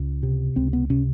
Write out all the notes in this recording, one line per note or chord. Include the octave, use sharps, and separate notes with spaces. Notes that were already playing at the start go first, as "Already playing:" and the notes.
Already playing: C#2
C3
C#2 C4
B3
C3 C#4